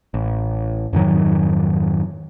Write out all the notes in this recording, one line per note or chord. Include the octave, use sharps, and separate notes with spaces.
A1
F2 G#2 D#3 F#3